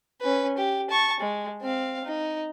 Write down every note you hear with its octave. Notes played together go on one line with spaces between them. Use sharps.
C#4 B4
G4
A5 C#6
G#3
C4 F5
D#4